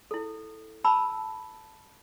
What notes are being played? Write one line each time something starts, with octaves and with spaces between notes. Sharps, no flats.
E4 A4
A5 B5 E6